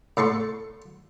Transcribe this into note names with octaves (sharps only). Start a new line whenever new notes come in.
A2 A4 C6 C#6